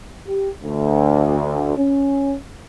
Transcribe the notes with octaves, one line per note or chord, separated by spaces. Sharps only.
G4
D2
C#4